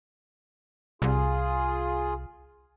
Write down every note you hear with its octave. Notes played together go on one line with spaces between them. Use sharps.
C2 F4 G#4